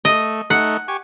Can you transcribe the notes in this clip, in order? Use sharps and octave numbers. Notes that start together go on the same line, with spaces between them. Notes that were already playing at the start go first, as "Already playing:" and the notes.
A3 D#5
A3 D#4 F#5
G4 G#5 C#6